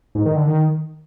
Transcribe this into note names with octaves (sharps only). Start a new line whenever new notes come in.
G#2
D#3
D3
D#3